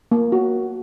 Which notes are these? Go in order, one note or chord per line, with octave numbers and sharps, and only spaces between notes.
A#3
F#4